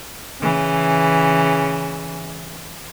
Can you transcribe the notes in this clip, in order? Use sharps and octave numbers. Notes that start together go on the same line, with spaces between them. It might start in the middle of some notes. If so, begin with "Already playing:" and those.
C#3 E3